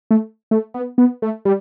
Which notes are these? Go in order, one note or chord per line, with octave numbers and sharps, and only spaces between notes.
A3
A3
B3
B3
A3
G3